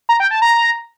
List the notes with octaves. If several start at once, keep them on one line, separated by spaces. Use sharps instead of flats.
A#5
G5
A5
A#5